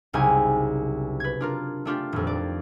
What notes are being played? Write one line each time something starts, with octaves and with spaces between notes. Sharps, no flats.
F#1 C2 C#3 D#4 G#5
B4 G#6
D4 F4 A#4
A3 D4 F4 G4
D#1 F2
D5